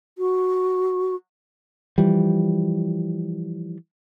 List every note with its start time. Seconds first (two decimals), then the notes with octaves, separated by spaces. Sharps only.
0.18 F#4
1.98 E3 F3 G3